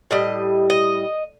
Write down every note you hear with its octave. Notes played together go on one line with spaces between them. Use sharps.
A2 G3 D#5
D#5